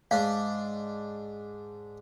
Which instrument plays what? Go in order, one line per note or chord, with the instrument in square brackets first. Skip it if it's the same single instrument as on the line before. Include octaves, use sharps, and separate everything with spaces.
[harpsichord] G#2 D4 [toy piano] F5